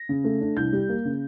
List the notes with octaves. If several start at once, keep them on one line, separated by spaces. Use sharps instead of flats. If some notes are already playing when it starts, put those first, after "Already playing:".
Already playing: A#6
C#3
A3
D4
C2 G6
G3
A#3
C#3